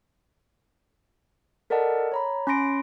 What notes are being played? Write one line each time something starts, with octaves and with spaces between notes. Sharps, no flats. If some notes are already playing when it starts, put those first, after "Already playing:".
A4 A#4 D5 D#5 F#5 A5
C#5 A#5 B5
C#4 B5 C6 A#6 D7